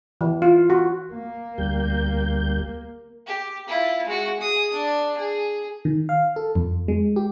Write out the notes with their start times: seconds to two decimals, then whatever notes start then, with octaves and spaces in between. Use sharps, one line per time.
0.21 E3
0.42 F4
0.70 F#4
1.12 A#3
1.58 D2 G3 G6
3.27 G4
3.68 E4 F4
4.07 G#3 F#4
4.39 G#4 D#6
4.73 D4
5.18 G#4
5.85 D#3
6.09 F5
6.36 A4
6.55 F2
6.88 G#3
7.16 G4